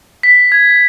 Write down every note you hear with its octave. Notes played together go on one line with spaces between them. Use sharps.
B6
G#6